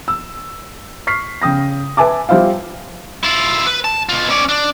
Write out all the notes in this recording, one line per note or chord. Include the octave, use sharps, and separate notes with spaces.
E6
C#6 F6 B6 C7
C#3 G5 D#6 A#6
B4 E5 G#5 A5 D6
G3 F4 C5 E5 F5
E4 F4
B4
A5
B2 F4
C#4 D5
D4